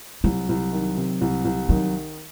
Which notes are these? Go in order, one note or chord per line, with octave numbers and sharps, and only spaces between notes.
C2 F#3
C2
D#3
C3
C2
C2
D#3 F#3